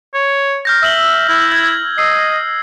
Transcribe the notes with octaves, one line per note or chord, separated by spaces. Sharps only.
C#5
F6 G6 A#6
E5 E6 F#7 G7
E4
G#6
D#5 E6 C7